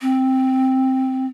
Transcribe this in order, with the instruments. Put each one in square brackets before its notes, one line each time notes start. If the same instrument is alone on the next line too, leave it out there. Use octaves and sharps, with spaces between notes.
[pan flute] C4